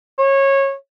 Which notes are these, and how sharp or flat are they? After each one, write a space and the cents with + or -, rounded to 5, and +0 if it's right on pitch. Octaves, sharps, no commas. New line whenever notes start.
C#5 -20